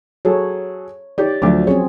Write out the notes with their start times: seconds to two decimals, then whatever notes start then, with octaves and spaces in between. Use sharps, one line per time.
0.25 F#3 G#4 A4 C#5
1.18 D#4 G4 C#5 D5
1.42 D2 F3 F#3 D4 D6
1.67 C4 C#4 G#4 C#5